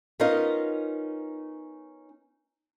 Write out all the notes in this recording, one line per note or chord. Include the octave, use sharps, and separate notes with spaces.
B3 C#4 D#4 F4 A#4 D#5